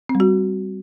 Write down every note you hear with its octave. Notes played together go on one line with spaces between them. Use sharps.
C4
G3
F#4